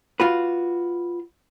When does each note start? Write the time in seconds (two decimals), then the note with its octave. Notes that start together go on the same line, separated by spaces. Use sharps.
0.20 F4 F#4 B4